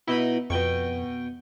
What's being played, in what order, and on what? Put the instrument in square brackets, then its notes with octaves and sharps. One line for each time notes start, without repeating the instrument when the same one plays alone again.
[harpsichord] B2 D#4 B5 [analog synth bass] E4
[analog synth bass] F2 [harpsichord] B2 G5 C#6